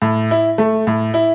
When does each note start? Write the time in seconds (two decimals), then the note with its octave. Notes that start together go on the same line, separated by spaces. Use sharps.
0.02 A2
0.31 E4
0.58 A3
0.87 A2
1.14 E4